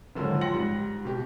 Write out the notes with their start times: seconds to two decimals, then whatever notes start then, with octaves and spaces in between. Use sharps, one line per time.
0.15 A#1 G#2 D3 D#3 F3 F#3
0.41 G5 C6 A#6 C#7 F#7
0.54 G#2 G3
1.05 B2 G4